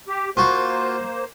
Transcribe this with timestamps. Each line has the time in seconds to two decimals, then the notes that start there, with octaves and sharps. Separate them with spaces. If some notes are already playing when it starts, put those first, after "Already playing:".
0.08 G4
0.37 A#3 F4 F#4 C5